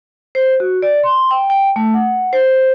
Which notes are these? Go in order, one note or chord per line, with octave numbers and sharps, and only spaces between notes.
C5
F#4
D5
C6
G5
G5
A3
F#5
C5